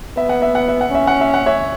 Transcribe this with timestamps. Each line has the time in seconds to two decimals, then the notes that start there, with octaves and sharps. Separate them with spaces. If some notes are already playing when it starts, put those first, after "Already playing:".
0.17 B3 E5
0.29 F#5
0.42 E5
0.55 F#5
0.68 E5
0.81 F#5
0.90 C#4 E5
1.07 F#5
1.21 E5
1.34 F#5
1.46 C#5 E5